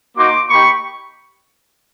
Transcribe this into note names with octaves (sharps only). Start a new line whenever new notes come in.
A#3 D#4 F#4 C6 D6
A#3 D#4 G4 B5 C#6